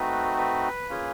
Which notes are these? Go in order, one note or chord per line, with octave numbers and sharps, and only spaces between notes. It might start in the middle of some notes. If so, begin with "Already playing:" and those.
Already playing: A3 C4 D#4 F#4 B4
B4
A#3 C#4 F4 G#4